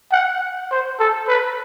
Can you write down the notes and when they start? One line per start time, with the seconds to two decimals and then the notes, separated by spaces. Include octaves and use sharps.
0.12 F#5
0.71 C5
0.99 A4
1.28 B4